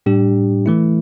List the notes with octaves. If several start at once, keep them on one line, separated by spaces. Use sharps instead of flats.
A2 G3 D4 G4
E3 A3 E4